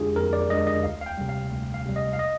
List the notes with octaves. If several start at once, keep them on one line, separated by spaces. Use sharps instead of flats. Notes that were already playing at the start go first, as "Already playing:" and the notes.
Already playing: F2 D3 G#3 D4 F4 G4 G#4
F2 A#4
D5
D3 G#3 D4 D#5
D#5
D2 F5
F5
G5
C3 G3
F5
D2
F5
C3 G3
D#5
F5
D#5